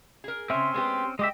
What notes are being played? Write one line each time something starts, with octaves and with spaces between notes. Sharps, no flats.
G#4 A#4
C#3 A#3 C4 C#4 E5 C6
G#3 B3 G4
G#3 G4 D#5 E5 G5